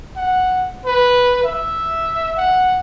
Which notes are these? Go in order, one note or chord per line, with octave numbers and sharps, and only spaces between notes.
F#5
B4
E5
F#5